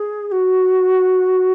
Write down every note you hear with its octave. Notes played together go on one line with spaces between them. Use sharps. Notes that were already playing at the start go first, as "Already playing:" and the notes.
Already playing: G#4
G#4
F#4